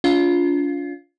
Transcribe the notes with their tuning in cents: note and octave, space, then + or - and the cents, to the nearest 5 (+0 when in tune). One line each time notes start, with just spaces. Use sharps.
D4 -45 F4 +5